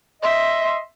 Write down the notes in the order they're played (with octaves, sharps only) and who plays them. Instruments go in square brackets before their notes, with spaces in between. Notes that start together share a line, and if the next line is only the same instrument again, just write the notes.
[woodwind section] D#5 C6 [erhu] E5